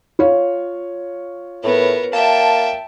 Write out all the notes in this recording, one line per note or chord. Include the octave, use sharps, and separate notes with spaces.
F4 C#5 F5
A2 B3 A#4
A#3 E5 G5 A5